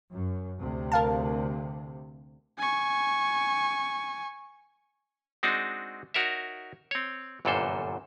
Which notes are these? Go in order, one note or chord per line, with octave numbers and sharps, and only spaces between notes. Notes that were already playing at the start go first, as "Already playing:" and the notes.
F#2
D2 C3
A#4 F5 A5
G#5 C#6
G#3 C4 D4 D#4 F#4
D#4 F#4 A#4 C#5 E5
C4 C#5
G1 F#2 A#2 E3 A4 C5